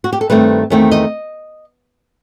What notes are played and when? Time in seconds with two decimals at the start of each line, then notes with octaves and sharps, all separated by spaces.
0.04 F#4
0.13 G4
0.21 A4
0.30 G2 D#3 A3 C4 B4
0.70 E2 D#3 A3 C4
0.92 D#5